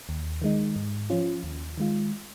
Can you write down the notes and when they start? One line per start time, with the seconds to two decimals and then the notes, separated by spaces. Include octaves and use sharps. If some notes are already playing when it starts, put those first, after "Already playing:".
0.09 D#2
0.42 D#3 G#3 D#4
0.76 G#2
1.10 F3 C#4 F4
1.43 D#2
1.78 D#3 G#3 F4